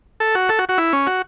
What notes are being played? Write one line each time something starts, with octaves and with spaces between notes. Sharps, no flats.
A4
F#4
A4
F#4
F#4
E4
C#4
F#4